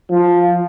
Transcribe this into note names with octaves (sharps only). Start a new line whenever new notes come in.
F3